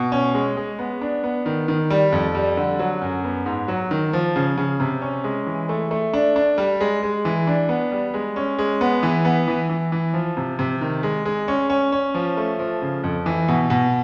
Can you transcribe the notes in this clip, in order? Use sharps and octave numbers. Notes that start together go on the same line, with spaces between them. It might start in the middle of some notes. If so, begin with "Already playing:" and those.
Already playing: B2
C#4
G#3
G#3
B3
D4
B3
D#3
D#3
G3
F2
G3
D3
F#3
F#2
B3
G#2
F#3
D#3
F3
C#3
C#3
C3
C#4
G#3
E3
A3
A3
D4
D4
G3
G#3
G#3
E3
D4
B3
G3
G#3
C#4
G#3
B3
E3
B3
E3
E3
E3
F3
C3
C3
D#3
G#3
G#3
C#4
C#4
C#4
F3
A3
F3
C#3
F2
E3
B2
B2